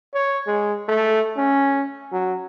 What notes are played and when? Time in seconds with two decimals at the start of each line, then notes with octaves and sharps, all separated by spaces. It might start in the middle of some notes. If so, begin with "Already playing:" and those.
0.14 C#5
0.47 G#3
0.88 A3
1.37 C#4
2.12 F#3